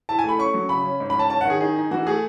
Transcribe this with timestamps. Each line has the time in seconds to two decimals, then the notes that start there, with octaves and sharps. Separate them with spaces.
0.09 E4 A5
0.19 G#5
0.24 A3 B5
0.38 C#4 C#6
0.54 F#3
0.69 C#3 B5
0.85 C#4
1.00 G#2
1.10 C#4 B5
1.19 A5
1.30 C#4 A5
1.41 D#3 F#5
1.50 G#4
1.61 D#4 G#4
1.76 D#4
1.91 E3 F#4
2.06 A3 G#4